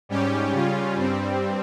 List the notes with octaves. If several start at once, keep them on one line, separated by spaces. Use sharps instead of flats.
G#2 G3 C#4 G4
C#3 G3 C#4 F4
G2 G3 C4